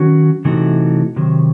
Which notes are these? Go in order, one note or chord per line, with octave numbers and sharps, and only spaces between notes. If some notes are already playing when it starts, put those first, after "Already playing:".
Already playing: D#3 F#3 C#4 F#4
C3 E3 A3 D#4 F#4
C3 D#3 F#3